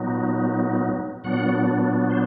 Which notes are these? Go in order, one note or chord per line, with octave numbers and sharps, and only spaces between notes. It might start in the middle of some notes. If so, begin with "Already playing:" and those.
Already playing: A#2 F#3 B3 D#4
A#2 F#3 B3 D4 F#5
C5